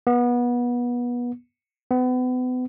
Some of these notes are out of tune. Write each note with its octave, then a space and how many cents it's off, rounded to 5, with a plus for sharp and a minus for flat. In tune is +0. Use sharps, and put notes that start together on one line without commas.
B3 -25
B3 +35